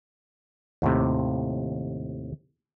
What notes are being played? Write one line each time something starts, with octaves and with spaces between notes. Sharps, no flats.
D#2 A2 C3